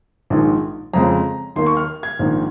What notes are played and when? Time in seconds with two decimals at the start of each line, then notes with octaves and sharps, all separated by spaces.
0.30 A#1 G#2 D#3 G#3
0.94 F2 C#3 G#3 C4 A#5
1.56 D#2 D#3 A#3 C6
1.67 C#6
1.77 F6
2.03 G#6
2.19 A#1 G#2 D#3 A#3